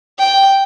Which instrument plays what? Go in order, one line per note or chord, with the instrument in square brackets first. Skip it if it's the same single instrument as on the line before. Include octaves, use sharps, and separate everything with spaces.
[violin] G5